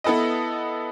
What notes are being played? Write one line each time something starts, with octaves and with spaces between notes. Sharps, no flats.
B3 E4 A4 B4 D#5